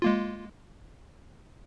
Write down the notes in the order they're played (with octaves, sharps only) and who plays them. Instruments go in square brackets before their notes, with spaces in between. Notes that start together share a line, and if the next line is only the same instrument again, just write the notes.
[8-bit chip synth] G#3 A#3 F4